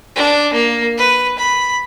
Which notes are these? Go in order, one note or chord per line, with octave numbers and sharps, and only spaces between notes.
D4
A#3
B4
B5